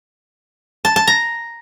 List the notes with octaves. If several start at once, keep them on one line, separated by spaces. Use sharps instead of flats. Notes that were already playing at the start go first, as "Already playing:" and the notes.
A5
A5
A#5